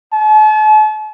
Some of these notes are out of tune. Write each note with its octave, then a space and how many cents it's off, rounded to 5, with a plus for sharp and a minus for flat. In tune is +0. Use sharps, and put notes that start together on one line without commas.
A5 -45